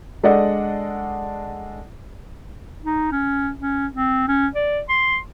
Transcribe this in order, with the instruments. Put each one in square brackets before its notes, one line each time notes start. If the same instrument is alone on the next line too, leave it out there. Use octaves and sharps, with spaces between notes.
[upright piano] G#3 D4 A4 D5 D#5 F#5
[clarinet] D#4
C#4
C#4
C4
C#4
D5
C6